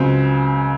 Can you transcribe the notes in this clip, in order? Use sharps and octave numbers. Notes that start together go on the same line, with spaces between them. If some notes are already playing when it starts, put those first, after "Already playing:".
Already playing: C#2 C#3 F#3 C4